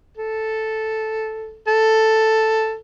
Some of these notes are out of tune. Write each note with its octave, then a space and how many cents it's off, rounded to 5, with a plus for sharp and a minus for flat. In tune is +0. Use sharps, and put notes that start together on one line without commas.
A4 -5
A4 +5